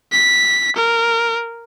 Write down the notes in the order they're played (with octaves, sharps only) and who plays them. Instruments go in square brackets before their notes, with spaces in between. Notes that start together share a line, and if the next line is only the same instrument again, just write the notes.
[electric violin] B6
A#4